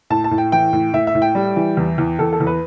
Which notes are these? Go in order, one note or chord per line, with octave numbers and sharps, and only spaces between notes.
A2 A5
A5
A2
G5
E3 G5
A2
A2 E5
E5
A2
G5
G3
E3
E2
E2
E2 A4
A4
E2
B4